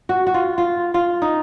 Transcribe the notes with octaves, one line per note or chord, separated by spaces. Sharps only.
F#4
F#4
F4
F4
F4
D#4